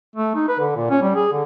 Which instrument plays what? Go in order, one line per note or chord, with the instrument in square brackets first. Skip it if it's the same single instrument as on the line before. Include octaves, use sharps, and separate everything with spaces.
[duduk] A3
D#4
B4
D3
A#2
C#4
G3
G#4
D3